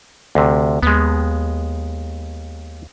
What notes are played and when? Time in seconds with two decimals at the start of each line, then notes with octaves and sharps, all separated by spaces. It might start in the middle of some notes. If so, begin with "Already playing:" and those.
0.35 D2 C3
0.83 D#2 G#3 B3